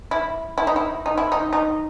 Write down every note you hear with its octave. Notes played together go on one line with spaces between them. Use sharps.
E4
E4
D#4
E4
D#4
E4
D#4
D#4